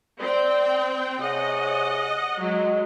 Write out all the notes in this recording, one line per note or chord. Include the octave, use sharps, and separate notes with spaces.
C4 D5 G5
C3 G#4 C#5 D#5 F#5
F#3 G#3 D#5